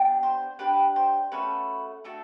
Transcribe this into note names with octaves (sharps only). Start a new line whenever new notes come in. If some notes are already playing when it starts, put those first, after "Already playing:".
Already playing: B3 D4 G4
C5
D4 G4 B4
C5
A3 C#4 F#4 A4 B4
A3 D4 F#4 A4